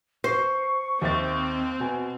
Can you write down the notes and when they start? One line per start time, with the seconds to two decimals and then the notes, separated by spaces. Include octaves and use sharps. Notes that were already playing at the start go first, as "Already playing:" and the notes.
0.24 C5 C#6 C7
1.02 D#2 C4 E5 A6
1.80 B2 G#5